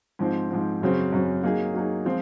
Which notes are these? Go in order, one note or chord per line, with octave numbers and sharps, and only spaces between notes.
G#2 F3 C4
G#2 F3 C4
F#2 C#3 F#3 C4
F#2 C#3 F#3 C4
F#3 A#3 D#4 G#4
F#3 A#3 D#4 G#4
F3 G#3 C4 F4